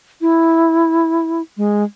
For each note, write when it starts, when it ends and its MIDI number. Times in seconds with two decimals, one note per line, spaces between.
0.21 1.42 64
1.57 1.84 56